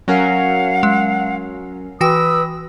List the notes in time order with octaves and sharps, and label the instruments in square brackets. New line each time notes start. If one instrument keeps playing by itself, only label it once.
[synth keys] F#3 C#4 A#4 [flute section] F5 F#5
[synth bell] G#3
[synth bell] E3 F#4 G5 [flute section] B4 D#6 E6